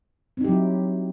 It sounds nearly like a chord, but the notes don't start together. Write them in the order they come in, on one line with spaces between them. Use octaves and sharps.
C4 D#4 G4 F#3 E4